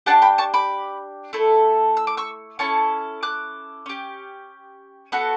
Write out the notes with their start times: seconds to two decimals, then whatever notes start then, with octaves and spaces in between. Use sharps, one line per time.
0.06 D4 G4 F#5 A5
0.22 G5 B5
0.38 A5 C#6
0.54 B5 D6
1.33 A3 E4 A4
1.97 E6
2.07 D6
2.17 C#6 E6
2.59 C#4 E4 A4 A5 C#6
3.23 D6 F#6
3.86 C#4 G4
5.12 B3 F#4 A4